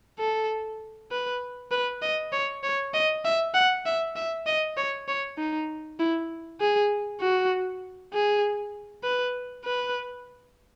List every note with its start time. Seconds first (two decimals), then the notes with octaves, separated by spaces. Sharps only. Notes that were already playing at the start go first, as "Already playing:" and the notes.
0.19 A4
1.11 B4
1.72 B4
2.02 D#5
2.33 C#5
2.63 C#5
2.94 D#5
3.25 E5
3.54 F#5
3.86 E5
4.16 E5
4.47 D#5
4.77 C#5
5.08 C#5
5.38 D#4
5.99 E4
6.61 G#4
7.21 F#4
8.13 G#4
9.04 B4
9.65 B4